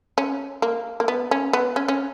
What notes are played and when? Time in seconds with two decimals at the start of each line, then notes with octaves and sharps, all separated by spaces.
0.18 C#4
0.62 A#3
1.00 A#3
1.08 B3
1.31 C#4
1.53 B3
1.76 C#4
1.88 C#4